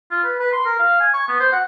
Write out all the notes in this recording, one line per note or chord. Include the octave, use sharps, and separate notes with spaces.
F4
B4
B4
C6
A#4
F5
G#5
C#6
B3
C5
F#5